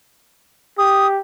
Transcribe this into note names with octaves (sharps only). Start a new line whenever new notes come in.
G4 D#6